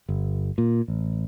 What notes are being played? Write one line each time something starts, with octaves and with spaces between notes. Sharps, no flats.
G1
A#2
A1